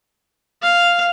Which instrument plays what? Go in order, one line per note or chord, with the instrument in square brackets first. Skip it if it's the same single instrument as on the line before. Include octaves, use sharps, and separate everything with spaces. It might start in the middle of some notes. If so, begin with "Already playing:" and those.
[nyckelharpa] F5